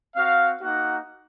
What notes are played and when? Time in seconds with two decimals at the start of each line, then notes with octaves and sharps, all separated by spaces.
0.16 C4 F#4 F5
0.62 A#3 D#4 F#4 F#5